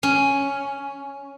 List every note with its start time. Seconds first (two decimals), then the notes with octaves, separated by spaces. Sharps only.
0.03 C#4